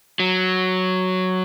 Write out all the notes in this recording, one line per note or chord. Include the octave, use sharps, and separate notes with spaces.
F#3